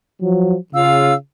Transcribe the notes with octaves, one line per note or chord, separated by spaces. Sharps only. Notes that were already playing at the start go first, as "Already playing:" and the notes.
F3 F#3
C#3 F4 F5 E6